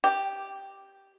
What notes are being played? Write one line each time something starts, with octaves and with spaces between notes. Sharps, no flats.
G4